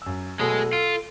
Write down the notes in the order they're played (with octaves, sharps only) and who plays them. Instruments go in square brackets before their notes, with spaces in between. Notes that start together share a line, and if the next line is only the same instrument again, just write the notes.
[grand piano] F#2 E6
[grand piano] B2 F#3 A3 [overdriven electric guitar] G#3 G#4 [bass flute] A4
[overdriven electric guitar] F4 [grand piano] D7